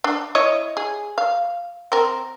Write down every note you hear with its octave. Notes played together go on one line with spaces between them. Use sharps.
D4
E4 C#5 D#5
G#4
F5
C4 A#4